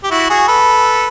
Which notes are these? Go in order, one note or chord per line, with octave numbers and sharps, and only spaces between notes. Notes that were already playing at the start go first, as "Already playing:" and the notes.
G4
E4 F#4
F#4 G#4
A4 B4